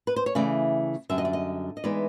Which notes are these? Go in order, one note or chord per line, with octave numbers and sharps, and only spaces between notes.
B4
C5
C#5
C#3 E3 A3 D5
F#2 D3 G3 E5
D#5
D5
D#5
D#5
E3 G#3 B3 D#4 D5